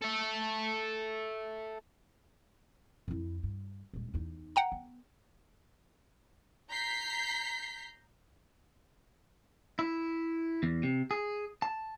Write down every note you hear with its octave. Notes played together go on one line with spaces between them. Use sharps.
A4 E5
F2 E4
G2
D#1 G#3
E2 D#4
F#5 G5 A#5
B3
A#5 G6 B6 C7
E4
E2
C3
G#4
A5